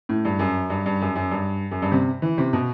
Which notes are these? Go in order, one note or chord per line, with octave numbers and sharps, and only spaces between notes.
A2
G2
F#2
G2
G2
F#2
F#2
G2
F#2
G2
C3
E3
C3
B2